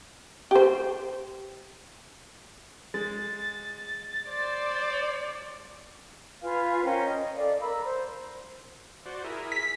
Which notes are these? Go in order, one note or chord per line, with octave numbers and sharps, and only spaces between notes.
G4 C5
G#3 A6
C5 D5
F4 B4 F5 G#5
C#4 A#4 C5 G5
D#5
A4 D5 F5
A#4 B5 E6
C5
F#4 C5 D5
E4 G#4 A#4
B6